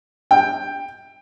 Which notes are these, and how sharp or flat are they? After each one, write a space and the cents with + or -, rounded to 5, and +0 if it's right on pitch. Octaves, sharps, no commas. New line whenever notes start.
G5 +15